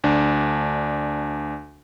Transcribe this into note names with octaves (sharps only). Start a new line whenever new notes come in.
D2 D4